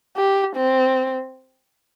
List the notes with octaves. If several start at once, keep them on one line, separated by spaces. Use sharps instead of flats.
G4
C4